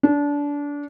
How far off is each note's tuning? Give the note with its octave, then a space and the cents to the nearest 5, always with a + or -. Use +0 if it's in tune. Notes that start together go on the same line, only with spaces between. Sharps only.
D4 -25